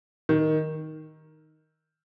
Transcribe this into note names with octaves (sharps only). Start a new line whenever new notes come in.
D#3